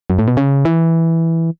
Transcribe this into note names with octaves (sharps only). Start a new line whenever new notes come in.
F#2
A2
B2
C#3
E3